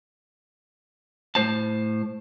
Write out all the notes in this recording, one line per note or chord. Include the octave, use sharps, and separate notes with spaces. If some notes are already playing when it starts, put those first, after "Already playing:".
A2 C5 A5